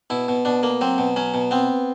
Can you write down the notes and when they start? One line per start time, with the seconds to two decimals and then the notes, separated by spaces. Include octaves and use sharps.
0.10 B2 E4
0.28 B2
0.45 B2 D4
0.63 A#3
0.81 F#3 C4
0.98 B2
1.16 F#3 C#4
1.34 B2
1.51 B3 C4